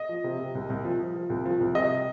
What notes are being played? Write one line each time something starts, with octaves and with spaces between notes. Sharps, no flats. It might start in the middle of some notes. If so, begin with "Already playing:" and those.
Already playing: D#5
F3
C3
C3
C2
C2
F3
F3
F3
C2
F3
C2
C3 D#5